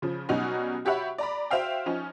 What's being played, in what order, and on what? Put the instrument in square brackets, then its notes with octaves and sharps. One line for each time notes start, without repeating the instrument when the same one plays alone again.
[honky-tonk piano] C#3 F3
B2 F#3 G3 C#4 D#4 F#4
F#4 G4 C#5 E5 F#5 B5
D5 A#5 B5
F#4 C5 E5 F5 G5
F3 C#4 D#4